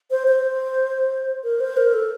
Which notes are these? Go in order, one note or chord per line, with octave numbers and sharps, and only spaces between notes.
C5
C5
A#4
C5
A#4
A4